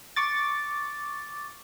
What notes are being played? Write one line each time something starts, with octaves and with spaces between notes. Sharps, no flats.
C#6 D6 A6